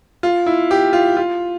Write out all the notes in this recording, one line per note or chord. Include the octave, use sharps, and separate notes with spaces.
F4
E4
G4
F4
F4